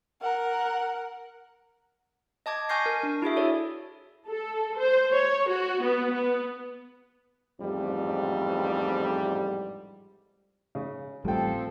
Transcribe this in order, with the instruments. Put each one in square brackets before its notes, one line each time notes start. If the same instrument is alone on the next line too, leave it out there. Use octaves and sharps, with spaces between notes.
[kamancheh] A#4 F#5
[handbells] D#5 A5 D6 G#6
G#5 C#6 F6 G6 A#6 C7
A#4
D4
E4 F#4 G#4 E5
A4 C#5 D5
[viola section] A4
C5
C#5
F#4
B3
B3
[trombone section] A1 F2 G#2 G3
[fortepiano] C#3
[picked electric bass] A1 G3 [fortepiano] D2 G5 [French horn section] F3 C4 A4